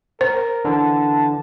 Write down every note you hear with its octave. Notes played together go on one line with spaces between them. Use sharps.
A#4 C5
D3 E3 A5